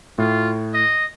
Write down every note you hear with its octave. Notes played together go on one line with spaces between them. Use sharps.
A2 F4
D#5